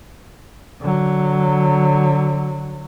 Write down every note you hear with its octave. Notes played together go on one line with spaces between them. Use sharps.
D3 F#3